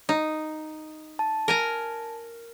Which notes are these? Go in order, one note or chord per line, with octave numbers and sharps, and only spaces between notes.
D#4
A5
A#4 G#5 A#5